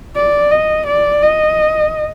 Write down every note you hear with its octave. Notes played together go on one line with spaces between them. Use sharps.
D5
D#5
D5
D#5